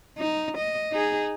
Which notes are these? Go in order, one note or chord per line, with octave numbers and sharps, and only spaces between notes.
D#4
D#5
D#4 G#4